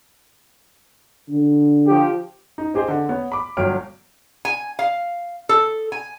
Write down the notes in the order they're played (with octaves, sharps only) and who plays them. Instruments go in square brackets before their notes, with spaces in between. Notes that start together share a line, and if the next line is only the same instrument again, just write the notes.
[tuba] D3
[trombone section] F3 G4
[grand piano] D#4
C4 G4 G#4 C5 D#5
D3
B3 C#5
B5 D6
G1 F#3 C#5 G5 F6 D7
[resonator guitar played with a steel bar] G#5
F5
A4
G#5